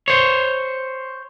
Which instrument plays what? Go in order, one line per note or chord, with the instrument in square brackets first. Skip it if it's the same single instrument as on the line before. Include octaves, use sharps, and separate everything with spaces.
[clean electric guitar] C5 C#5